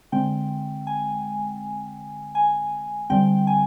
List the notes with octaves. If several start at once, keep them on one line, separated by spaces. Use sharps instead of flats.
D3 G#3 C4 G5
G#5
G#5
D3 G3 C4 G5
G#5